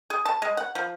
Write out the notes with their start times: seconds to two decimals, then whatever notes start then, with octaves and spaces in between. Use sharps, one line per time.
0.10 G#4
0.25 A5
0.42 G#3
0.57 F#5
0.75 F3